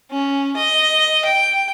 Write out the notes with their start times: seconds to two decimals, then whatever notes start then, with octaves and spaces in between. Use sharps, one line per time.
0.11 C#4
0.56 D#5
1.25 G5